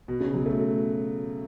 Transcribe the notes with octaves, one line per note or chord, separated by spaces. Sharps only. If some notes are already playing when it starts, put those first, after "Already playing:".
B2
C#3
F#3
A3